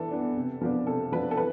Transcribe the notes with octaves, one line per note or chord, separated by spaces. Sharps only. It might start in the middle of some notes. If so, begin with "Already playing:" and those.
Already playing: E3 D4 A4
B3 D4
C3
F3 B3 D4
C3 A4
F3 B3 D4 B4
A4
E3 B4